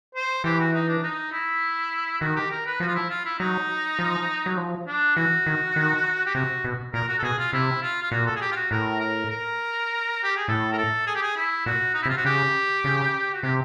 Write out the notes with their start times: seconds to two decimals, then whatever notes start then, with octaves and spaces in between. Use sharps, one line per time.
0.15 C5
0.44 E3 G4
0.59 F#4
0.73 D#4
0.88 D4
1.03 D#4
1.32 E4
2.21 D#3 F#4
2.36 G4
2.51 A#4
2.66 B4
2.80 F3 F#4
2.88 F4
2.95 E4
3.10 F4
3.25 E4
3.39 F#3 D#4
3.99 F3
4.46 F#3
4.57 F3
4.87 D4
5.16 E3 F#4
5.46 D#3
5.76 D#3
6.26 G4
6.35 C3 F#4
6.64 B2
6.94 A#2 A#4
7.09 F#4
7.19 A4
7.23 B2 G#4
7.38 F4
7.53 C3 E4
7.82 F4
8.03 F4
8.11 A#2 F#4
8.26 A4
8.35 G#4
8.41 G4
8.52 F4
8.56 F#4
8.71 A2 A#4
9.00 A#4
9.30 A#4
10.23 G4
10.36 G#4
10.48 A2 A4
10.72 A#4
10.78 A4
11.07 G#4
11.15 G4
11.22 G#4
11.37 E4
11.66 A#2 F#4
11.94 D#4
12.02 E4
12.05 C3
12.09 F4
12.17 F#4
12.25 C#3 G4
12.84 C#3
13.33 F#4
13.43 C3 G4